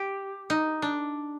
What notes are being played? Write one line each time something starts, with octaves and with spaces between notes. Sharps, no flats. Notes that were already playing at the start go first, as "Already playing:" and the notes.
Already playing: G4
D#4
D4